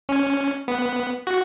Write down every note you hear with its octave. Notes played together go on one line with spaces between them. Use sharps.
C#4
B3
F#4